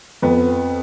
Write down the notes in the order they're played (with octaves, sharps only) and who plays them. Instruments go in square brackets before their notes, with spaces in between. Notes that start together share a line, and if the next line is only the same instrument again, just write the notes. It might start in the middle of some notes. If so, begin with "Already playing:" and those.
[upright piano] F2 B3